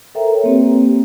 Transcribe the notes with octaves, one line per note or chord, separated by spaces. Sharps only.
A4 A#4 C5 E5 G5 A#5
B4 C#5
A#3 C4 G4